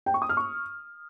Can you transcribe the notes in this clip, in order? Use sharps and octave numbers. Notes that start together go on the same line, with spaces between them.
G5
C#6
D#6
F6
C#6